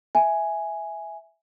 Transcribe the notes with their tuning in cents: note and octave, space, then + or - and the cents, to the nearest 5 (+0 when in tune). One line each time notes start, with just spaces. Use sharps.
E5 +0 G#5 +0